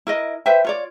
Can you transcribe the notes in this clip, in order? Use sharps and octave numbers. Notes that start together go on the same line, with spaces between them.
E4 A#4 D#5
B4 C5 E5 G5
F4 C#5 D5